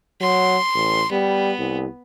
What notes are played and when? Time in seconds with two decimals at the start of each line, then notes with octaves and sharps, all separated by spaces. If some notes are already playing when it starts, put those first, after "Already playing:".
0.21 F#3 C6
0.75 A1
1.12 G3 B3
1.59 C2